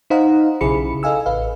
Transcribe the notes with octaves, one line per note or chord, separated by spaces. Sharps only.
D#4 C5 D#5 F5 F#5 A#5
B1 C#3 E4 G#4 B5 C#7
A4 D#5 F5 G#5 E6
A1 B4 F5